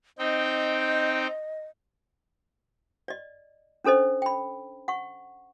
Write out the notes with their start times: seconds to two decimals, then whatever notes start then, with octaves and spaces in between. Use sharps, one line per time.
0.19 C4 D#4 D#5 G5
3.08 D5 D#5
3.84 C#4 D4 A4 C5 D#5
4.22 G5 B5
4.88 F#5 C#6